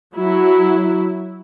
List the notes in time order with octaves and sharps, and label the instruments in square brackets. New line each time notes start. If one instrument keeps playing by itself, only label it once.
[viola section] F#3 E4